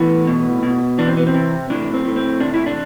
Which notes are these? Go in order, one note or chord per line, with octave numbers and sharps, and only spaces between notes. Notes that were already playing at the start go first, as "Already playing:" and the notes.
Already playing: A2 E3 B3
B2
B2
E3 D4
C4
B3
C4
C3
A2 D4
C4
A2
C4
C3 D4
E4
D4